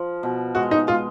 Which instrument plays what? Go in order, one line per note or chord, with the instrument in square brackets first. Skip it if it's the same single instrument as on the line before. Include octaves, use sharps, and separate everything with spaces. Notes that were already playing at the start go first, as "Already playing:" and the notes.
Already playing: [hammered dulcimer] F3
B2
[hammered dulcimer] G#3 [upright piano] F#4
[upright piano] D#4
[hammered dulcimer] G#3 [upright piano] F4